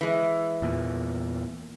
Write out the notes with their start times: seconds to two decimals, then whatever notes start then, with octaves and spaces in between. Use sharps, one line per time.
0.01 E3 G#3
0.62 E2 A#2